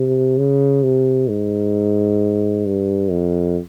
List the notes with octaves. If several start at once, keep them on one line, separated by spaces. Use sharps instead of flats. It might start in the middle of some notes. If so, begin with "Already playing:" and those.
Already playing: C3
C#3
C3
G#2
G2
F2